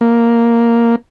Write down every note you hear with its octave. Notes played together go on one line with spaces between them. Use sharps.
A#3